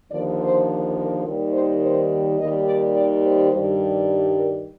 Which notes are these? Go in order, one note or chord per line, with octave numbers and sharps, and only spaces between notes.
D#2 D3 F3 D5
C5
A#4
D#2 D#3 G3
C5
C5
D#2 D#3 G3 D#5
D5
D5
C5
G2 D#3 G3
A#4